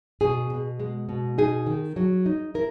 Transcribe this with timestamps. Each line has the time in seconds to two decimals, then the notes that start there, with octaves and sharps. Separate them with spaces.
0.21 B2 G#4
0.50 B2
0.80 G#3
1.09 B2
1.38 D#4 G#4
1.66 D#3
1.96 F#3
2.26 D#4
2.54 E4 A#4